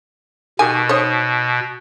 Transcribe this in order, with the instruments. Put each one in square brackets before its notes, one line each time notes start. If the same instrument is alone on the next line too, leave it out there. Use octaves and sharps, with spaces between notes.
[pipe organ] B2 [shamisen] D#3 G4 G#5
[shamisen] D#4 C5 C#5